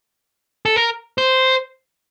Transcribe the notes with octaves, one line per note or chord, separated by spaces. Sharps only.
A4
A#4
C5